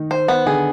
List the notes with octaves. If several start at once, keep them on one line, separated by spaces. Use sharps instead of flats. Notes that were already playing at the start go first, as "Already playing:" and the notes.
Already playing: D#3 D#4
C5
B3
D3 D4 G#4